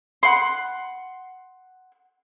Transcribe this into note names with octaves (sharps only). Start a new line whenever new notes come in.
F#5 C6